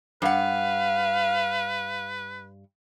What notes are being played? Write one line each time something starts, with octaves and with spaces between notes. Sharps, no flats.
G2 B4 F5 F#5